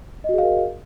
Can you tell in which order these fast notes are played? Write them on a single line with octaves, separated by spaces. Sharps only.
D#5 F#4 G#4 F5 A#4